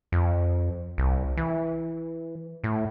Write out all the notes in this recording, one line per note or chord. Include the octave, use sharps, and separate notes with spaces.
F2
C2
E3
A2